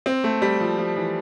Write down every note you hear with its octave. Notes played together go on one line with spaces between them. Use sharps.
C4
A3
G3
F3
F3
E3